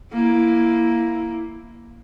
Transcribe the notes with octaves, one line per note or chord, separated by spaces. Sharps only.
A#3 E4